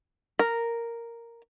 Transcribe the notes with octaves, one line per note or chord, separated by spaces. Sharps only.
A#4